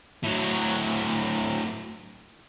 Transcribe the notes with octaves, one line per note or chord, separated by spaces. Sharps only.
A2 F#3